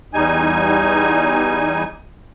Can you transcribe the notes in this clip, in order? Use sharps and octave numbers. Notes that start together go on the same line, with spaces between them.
E2 G3 D#4 G#5